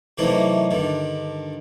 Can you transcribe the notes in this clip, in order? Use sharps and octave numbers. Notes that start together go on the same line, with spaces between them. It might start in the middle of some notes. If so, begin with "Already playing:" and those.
C3 E3 F#3 A3 A#3 D#4
G2 D3 D#3